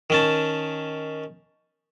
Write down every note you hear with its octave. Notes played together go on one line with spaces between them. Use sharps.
D#3 C#4 A5